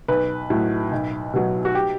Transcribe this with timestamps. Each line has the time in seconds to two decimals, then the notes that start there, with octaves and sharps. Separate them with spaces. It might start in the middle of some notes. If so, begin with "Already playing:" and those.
0.08 B1 B4
0.50 A2 F#3
0.92 B1
1.33 B2 F#3
1.65 F#4
1.75 G4